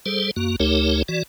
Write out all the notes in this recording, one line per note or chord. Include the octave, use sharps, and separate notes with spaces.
G3 G#4 A4 C5
F#2 A#3 F#4
D2 A3 D#4 G4 A#4 C#5
E3 F#4 D5